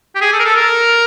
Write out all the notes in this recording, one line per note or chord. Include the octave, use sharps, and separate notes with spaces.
G4
G#4
A4
A#4
A4
A#4